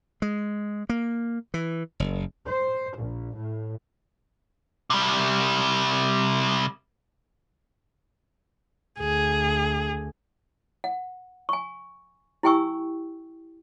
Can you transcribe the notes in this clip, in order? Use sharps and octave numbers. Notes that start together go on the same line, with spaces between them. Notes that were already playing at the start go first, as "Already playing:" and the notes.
G#3
A#3
E3
F#1
C5
A#1
A2
C3 G3
D2 G#4
F#5
G#5 C#6
E4 G4 G5 G#5 C#6 E6